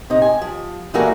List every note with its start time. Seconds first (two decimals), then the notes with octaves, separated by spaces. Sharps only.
0.10 C3 D#4
0.22 G#5
0.42 F3
0.94 E3 G3 A3 A#3 F#4 G#4